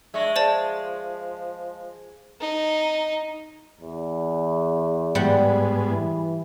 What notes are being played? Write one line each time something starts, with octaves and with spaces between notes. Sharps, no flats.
G#3 D4 E5 C#6 A#6
F3 C5 D5 A5
D#4
E2
G#2 G3 B3 F#5
E3